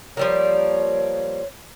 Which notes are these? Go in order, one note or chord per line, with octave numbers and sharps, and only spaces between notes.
F3 G3 A#3 C#5